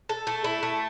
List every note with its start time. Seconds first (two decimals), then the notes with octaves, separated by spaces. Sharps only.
0.09 A4
0.27 A3 A5
0.44 E4
0.50 A5
0.63 A3
0.74 A5